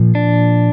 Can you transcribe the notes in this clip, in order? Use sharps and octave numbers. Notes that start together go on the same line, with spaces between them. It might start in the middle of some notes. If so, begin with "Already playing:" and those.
Already playing: A#2 F3
D4